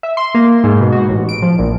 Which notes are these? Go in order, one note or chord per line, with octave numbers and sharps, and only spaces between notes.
E5
C6
A#3
G#2
B2
F#4
A1
D7
F3
A#1